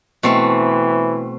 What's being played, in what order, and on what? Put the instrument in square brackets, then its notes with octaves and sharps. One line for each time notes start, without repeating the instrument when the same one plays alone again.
[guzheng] B2 A3 C4 [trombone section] E3